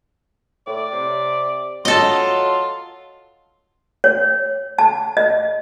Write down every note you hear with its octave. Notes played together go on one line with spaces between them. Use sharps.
A2 D5
C3
F#3 F4 A4 D#5
C#5
A5
D#5